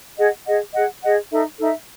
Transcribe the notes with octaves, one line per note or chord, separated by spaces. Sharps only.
G#4 D#5 F#5
G#4 D#5 F#5
G#4 D#5 F#5
G#4 D#5 F#5
D#4 A4 E5
D#4 A4 E5